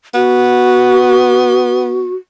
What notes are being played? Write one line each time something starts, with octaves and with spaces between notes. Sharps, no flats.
B3 F#4